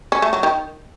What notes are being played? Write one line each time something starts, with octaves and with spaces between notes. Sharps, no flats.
C#4
A3
F#3
D#3